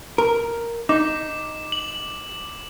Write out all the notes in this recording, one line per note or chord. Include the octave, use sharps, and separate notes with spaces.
A#4
D#4 D6
F#7